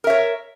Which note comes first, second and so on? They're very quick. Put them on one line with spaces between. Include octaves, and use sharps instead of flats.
A#4 E5 C#5